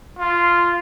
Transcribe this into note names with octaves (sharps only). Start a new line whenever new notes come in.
F4